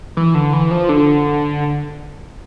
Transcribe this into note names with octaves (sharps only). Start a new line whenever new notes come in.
E3
D3
E3
F3
D3